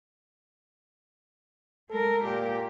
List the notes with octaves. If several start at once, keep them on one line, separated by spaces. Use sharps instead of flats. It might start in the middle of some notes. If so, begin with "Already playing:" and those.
G#3 A4 A#4
A#2 G4